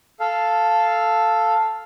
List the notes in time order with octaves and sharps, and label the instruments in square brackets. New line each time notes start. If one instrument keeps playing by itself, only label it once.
[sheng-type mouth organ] A4 F5